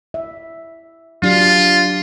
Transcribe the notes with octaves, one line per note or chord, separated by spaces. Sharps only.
E5
F#3 D4 F4 G4